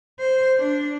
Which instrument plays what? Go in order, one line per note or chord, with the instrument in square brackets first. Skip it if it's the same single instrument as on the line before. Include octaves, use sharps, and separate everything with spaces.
[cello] C5
D4